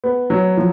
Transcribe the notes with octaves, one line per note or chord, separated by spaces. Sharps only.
B3
F#3
F3